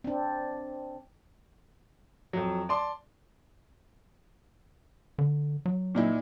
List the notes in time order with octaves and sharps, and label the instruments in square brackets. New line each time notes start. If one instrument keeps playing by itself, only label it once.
[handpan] C4 D4
[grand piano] F2 F#3
D5 A5 C6 D6
[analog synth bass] D3
F#3
[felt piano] A#2 D#4 E4